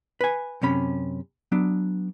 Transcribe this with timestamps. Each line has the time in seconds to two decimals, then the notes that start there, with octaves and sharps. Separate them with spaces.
0.21 B4 G#5
0.62 F#2 C3 C#4 B5
1.52 F#3 B3 D4